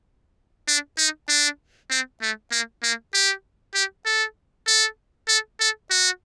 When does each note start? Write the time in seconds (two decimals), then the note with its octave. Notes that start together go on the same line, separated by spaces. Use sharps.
0.68 D4
0.98 D#4
1.29 D4
1.90 C4
2.22 A3
2.52 A#3
2.83 A#3
3.14 G4
3.75 G4
4.05 A4
4.67 A4
5.28 A4
5.60 A4
5.90 F#4